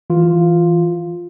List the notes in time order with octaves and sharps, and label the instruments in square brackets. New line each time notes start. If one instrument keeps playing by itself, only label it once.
[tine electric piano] E3 F4